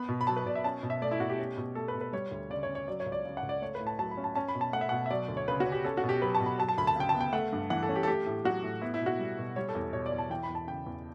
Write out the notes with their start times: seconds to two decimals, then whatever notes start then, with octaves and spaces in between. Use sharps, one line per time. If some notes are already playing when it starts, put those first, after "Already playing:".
Already playing: B3 B5
0.09 B2
0.21 B5
0.27 F#3 A5
0.36 B4
0.45 B2 D5
0.55 E5
0.64 C#4 A5
0.83 B2
0.90 E5
1.02 A3 D5
1.11 E4
1.20 B2 F#4
1.30 G4
1.39 C#4
1.57 B2
1.75 A3 A4
1.88 B4
1.95 B2
2.01 B4
2.13 G3 C#5
2.31 D2
2.50 C#3 D5
2.63 C#5
2.69 C#4
2.75 C#5
2.88 F#3 D5
3.00 C#5
3.06 C#2
3.12 D5
3.25 C#3
3.37 F#5
3.43 C#2
3.49 D5
3.61 A3 C#5
3.75 B4
3.80 A2
3.87 A5
3.99 F#3 A5
4.11 B5
4.17 C#4
4.24 A5
4.35 C#4 A5
4.48 B5
4.55 B2
4.61 A5
4.73 A3 F#5
4.81 E5
4.89 B2 F#5
5.06 E5
5.10 F#3 D5
5.28 D2
5.37 C#5
5.48 C#3 B4
5.60 F#4
5.66 C#4
5.72 G4
5.84 C#4 A4
5.97 F#4
6.03 B2
6.09 G4
6.22 F#3 B4
6.35 A5
6.40 B2
6.46 B5
6.58 F#3 A5
6.69 A5
6.78 D2 B5
6.87 A5
6.96 C#3 G5
7.09 A5
7.14 B3
7.21 G5
7.33 A3 F#5
7.52 G2
7.70 E3 F#5
7.83 A4
7.89 C#4
7.96 G4
8.03 A4
8.08 A3 G4
8.26 A2
8.45 F#3 F#4
8.63 A2
8.81 B3 E4
8.94 E4
9.01 B2
9.06 F#4
9.19 G3
9.38 B2
9.56 G3 C#5
9.69 A4
9.75 E2
9.93 B2 C#5
10.06 D5
10.12 E2
10.18 A5
10.30 E3 G5
10.43 B5
10.49 E2
10.55 A5
10.68 C#3 G5
10.86 E2